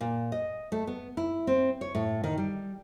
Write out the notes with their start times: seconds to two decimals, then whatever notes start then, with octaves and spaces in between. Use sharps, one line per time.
0.01 A#2
0.32 D#5
0.72 A3
0.87 B3
1.17 E4
1.47 C4
1.81 C#5
1.95 A2
2.23 D#3
2.38 G3